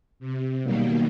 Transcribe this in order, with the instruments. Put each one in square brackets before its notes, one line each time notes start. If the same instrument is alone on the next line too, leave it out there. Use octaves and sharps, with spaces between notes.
[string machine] C3
B2 D#3 F#3 G3 A#3